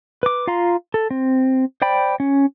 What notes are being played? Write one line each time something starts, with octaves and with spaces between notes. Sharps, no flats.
B4 D6
F4 F5 A#5 C6
A4
C4
C5 D5 G5 B5
C#4